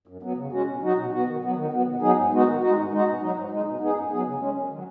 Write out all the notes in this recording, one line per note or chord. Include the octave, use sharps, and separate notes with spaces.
F#2
F#3 B3
C#3
G#3 C#4 F#4
B2
F#3 D#4 F#4
B2
B3 F#4
D#3
F#3 B3
D#3
F#3 B3
B2
F#3 B3 D#4 G#4
G#2
G#3 B3 D#4 F#4
D#3
G#3 D#4 F#4
G#2
G#3 D#4 F#4
B2
F#3 D#4
G#2
G#3 D#4
B2
B3 D#4 G#4
F#2
F#3 B3 G#4
C#3
G#3 C#4
F#2
D#3 F#3